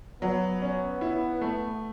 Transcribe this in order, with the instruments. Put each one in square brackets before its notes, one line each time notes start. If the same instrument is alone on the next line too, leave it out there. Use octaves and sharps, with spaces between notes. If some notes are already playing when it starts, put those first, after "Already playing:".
[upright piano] F#3 [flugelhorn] B3
[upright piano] C#4
E4
A3